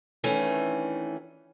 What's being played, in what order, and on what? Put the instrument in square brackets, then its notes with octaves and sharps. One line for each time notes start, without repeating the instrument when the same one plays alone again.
[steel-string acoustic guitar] D#3 E3 A3 C#4 D4